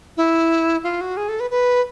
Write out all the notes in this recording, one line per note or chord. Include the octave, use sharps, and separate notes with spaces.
E4
F4
F#4
G#4
A4
B4
B4